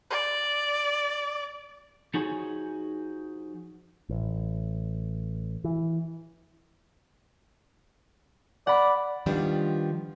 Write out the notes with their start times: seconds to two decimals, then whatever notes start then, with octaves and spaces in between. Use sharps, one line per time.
0.10 D5
2.14 F3 D#4 F#4 G#4 C#5 G#5
4.09 A1
5.64 E3
8.67 D5 F#5 B5
9.26 D#3 F3 G3 B3 D4 F4